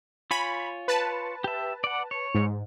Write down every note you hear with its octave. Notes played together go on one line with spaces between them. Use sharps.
F4 C#5 G#5 B5
B4 A5
G4 E5
D5 F#5
C#5
G#2